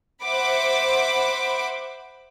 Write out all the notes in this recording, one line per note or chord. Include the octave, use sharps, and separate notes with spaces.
C5 E5 F#5 B5 D6